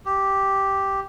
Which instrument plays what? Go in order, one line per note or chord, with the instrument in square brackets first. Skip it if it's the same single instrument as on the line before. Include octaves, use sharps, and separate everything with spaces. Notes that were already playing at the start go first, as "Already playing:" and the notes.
[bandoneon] G4